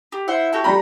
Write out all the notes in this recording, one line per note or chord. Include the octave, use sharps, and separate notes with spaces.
G4
E4 C5 E5 F#5
F#4 G4 A4
G3 A#5 B5